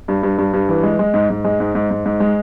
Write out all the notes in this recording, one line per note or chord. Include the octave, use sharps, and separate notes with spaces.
G2
G2
G2
G2
E3
G#3
G#3
G#2
G#2
G#3
G#2
G#2
G#2
G#2
G#3